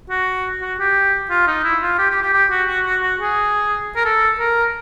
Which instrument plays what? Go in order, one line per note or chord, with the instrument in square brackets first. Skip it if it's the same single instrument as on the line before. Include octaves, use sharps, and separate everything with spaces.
[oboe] F#4
F#4
G4
F4
D#4
E4
F4
G4
G4
G4
G4
F#4
F#4
F#4
F#4
G#4
A#4
A4
A#4